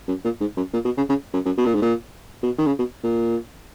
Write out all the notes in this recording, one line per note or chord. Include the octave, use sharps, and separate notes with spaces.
F#2
A#2
G#2
F#2
A#2
B2
C#3
C#3
F#2
F#2
B2
A#2
G#2
A#2
B2
D#3
C#3
B2
A#2